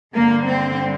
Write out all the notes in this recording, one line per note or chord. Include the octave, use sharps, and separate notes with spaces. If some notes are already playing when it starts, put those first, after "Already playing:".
G2 D3 A#3
C4